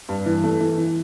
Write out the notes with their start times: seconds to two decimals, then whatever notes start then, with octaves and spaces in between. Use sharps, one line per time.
0.09 G2
0.26 E3
0.43 A3
0.61 E3
0.78 E3